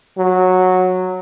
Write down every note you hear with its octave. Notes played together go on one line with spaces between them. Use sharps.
F#3